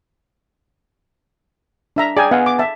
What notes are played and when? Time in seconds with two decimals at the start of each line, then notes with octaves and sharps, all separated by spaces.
1.96 D4 E5 A#5
2.17 G#4 D5 G5 G#5 A#5
2.31 B3 D#5 F5 F#5 G#5
2.46 D6
2.59 E5 A5